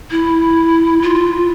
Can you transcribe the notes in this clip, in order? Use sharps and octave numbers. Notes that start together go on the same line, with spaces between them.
E4
F4